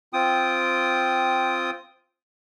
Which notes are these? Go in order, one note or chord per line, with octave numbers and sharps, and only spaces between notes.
C4 F4 G5 D#6